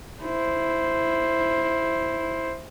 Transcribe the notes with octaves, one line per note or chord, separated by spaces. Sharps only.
E4 C5